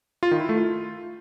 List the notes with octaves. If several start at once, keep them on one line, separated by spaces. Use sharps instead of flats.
F4
D#3
E4
A3
F4